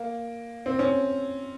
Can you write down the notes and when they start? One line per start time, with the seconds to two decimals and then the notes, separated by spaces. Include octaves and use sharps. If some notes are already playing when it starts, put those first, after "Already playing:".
Already playing: A#3
0.66 C4
0.79 C#4